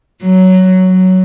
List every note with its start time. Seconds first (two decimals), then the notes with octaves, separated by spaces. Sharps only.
0.23 F#3
0.88 F#3